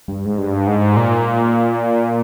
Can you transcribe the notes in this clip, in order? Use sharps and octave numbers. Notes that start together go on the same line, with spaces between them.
G2
G#2
G2
G#2
A#2